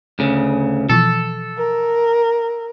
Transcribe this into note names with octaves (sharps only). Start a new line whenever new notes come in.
D2 C#3
B2 E3 F3 A4
A#4